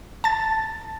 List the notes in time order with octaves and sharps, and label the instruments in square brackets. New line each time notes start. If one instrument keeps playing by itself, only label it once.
[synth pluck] A5 A6